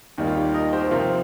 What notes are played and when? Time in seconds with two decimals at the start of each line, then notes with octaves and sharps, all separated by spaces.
0.18 D#2 D#3 G3 A#3 D#4
0.27 F4
0.37 G4
0.54 A#4 D#5
0.73 G4 C5
0.91 C3 F3 C4 F4 A#4